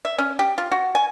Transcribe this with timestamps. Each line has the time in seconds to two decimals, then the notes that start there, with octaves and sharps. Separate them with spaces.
0.05 E5
0.18 C#4
0.39 G4
0.58 F4
0.72 F#4
0.95 G#5